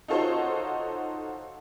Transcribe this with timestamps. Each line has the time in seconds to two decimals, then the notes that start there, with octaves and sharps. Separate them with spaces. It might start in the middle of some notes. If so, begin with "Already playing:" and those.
0.08 D#4 F4 F#4 A4 C5 C#5